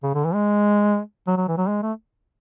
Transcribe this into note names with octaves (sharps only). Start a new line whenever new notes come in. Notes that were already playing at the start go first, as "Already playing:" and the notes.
C#3
D3
E3
G#3
F#3
F#3
E3
F#3
G#3
A3